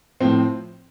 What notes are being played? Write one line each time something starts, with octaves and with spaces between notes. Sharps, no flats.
A2 F3 C4